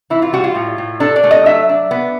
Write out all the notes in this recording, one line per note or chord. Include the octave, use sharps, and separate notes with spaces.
E3 E4
F4
G3 F#4
F4
A2
A2
D4 A4
D5
A3
D#5
F#3 E5
D4
B3